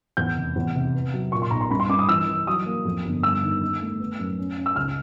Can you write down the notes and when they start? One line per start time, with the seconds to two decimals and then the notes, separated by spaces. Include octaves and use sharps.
0.17 E2 G6
0.36 F1
0.56 E2
0.75 C3
0.95 B3
1.14 F#3
1.32 A#2 C#6
1.42 C6
1.51 B1 A#5
1.61 C6
1.71 G2 B5
1.80 C6
1.89 G2 D6
1.99 D#6
2.09 E3 E6
2.27 E3
2.47 F#3 D#6
2.66 A#3
2.85 F2
3.05 G1
3.23 G3 E6
3.43 D#2
3.61 D#3
3.81 A3
3.99 B3
4.20 F#2
4.38 C#4
4.57 C#4
4.66 E6
4.76 C#2 F6